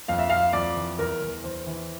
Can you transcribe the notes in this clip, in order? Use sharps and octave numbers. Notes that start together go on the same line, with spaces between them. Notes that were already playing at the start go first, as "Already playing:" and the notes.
F2 F5
E5
F2 F5
F2 D5
E3
E2 A#4
E2
E2 C5
E3